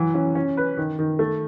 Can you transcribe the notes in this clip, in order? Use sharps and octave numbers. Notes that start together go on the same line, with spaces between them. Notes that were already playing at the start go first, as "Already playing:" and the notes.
Already playing: E3 F#3
C#4
C#4
B4
D#3
D#3
A3